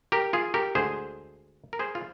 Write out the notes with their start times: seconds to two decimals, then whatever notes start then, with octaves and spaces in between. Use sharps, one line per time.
0.12 G4 A#4
0.33 F4 G#4
0.54 G4 A#4
0.75 D2 D3 G#3 G#4 C5
1.73 A#4
1.79 G#4 C5
1.95 F4